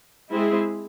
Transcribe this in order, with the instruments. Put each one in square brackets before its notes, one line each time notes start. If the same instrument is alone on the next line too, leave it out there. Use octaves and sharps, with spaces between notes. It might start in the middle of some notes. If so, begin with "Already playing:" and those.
[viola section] G#3 C4 E4 G#4